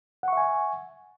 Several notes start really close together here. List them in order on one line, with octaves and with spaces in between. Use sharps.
F#5 C#6 E5 G#5